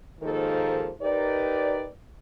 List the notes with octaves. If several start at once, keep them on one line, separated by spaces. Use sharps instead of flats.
D#2 G#2 D#3 F3 A#3 A4
D#4 G4 A#4 B4 D5